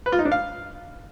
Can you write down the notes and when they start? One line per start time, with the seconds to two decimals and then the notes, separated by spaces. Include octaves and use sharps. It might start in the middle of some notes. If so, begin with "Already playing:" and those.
0.06 B4
0.12 F4
0.19 D#4
0.25 D4
0.32 F5